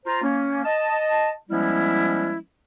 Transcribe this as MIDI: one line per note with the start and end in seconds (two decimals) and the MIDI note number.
0.06 0.22 65
0.06 0.22 72
0.06 0.22 82
0.23 0.62 58
0.23 0.62 61
0.65 1.31 75
0.65 1.31 81
1.50 2.38 53
1.50 2.38 55
1.50 2.38 56
1.50 2.38 59
1.50 2.38 61
1.50 2.38 64